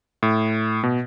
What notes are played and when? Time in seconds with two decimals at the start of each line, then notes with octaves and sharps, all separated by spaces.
0.23 A2
0.83 B2